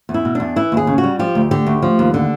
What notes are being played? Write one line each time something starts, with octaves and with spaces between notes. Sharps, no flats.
E2
E4
B2
E2 D4
E3 E4
D#2 G#4
C#3
F#4
G3
F3 G4
D2
D3 G4
D2
F3
D#2
D3